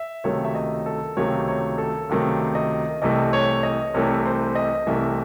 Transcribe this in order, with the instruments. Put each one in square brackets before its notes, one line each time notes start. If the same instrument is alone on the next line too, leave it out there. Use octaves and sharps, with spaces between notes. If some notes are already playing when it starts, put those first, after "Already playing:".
Already playing: [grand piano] E5
C#2 C3 D#3 F#3 A3 C#5
E5
D#5
A4
C#2 C3 D#3 F#3 A3 C#5
C#5
A4
C#2 C3 D#3 F#3 A3
D#5
C2 C3 E3 A3 D#5
C#5
D#5
C2 C3 E3 A3 C#5
C5
D#5
C2 C3 E3 A3 E5